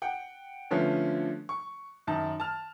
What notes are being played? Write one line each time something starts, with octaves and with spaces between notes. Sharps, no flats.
F#5 G5
D3 F3 A3 B3 C#4
C#6
F#2 D#3 A5
A5 F6